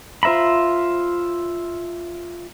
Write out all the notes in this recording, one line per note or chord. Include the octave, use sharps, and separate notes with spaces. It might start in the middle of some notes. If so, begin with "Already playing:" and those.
F4 C5 E5 A#5 B5